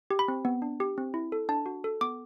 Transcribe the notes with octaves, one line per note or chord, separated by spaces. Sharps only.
G4
B5
C4
B3
D4
G4
C4
E4
A4
D4 A5
F#4
A4
B3 D6